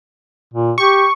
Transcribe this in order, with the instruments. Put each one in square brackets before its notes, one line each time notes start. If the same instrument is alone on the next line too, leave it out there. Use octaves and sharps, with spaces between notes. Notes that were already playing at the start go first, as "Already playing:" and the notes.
[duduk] A#2
[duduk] G4 [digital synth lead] C#6